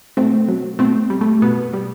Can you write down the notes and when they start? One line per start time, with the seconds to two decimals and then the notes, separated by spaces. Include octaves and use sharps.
0.17 B2 A3 C4
0.48 F#3
0.79 B2 A3 C4
1.10 G3
1.21 A3
1.42 B2 B3
1.73 G3